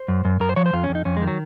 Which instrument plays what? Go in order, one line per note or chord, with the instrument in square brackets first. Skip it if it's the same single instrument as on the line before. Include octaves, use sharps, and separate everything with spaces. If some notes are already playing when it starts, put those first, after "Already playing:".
Already playing: [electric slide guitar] C5
F#2
F#2
F#2 A#4
C5
F3 C#5
C5
F2 F4
C#4
F2
D#4
F2 C#4
G#3
D#3
F#3